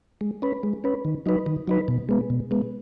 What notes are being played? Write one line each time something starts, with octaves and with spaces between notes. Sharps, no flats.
G#3
C#4 B4
G#3
C#4 B4
D#3
F#3 D#4 B4
D#3
F#3 D#4 B4
B2
G#3 B3
B2
G#3 B3